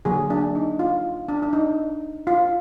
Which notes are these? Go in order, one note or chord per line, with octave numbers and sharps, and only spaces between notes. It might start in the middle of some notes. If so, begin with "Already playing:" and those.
D3 F#3 A#3 G#4
D4
D#4
F4
D4
D4
D#4
F4